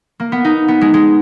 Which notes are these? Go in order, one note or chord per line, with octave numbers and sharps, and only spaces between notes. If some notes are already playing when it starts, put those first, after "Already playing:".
A#3
B3
D#4
B3
G#3
G#3